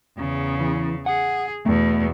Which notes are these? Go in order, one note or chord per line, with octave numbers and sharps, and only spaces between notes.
E2 C#3
E3
G#4 F#5
E2 B2 A3